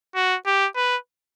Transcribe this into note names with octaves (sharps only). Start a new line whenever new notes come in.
F#4
G4
B4